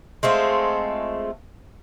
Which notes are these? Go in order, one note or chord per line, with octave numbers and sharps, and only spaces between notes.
G#3 A3 C4 F4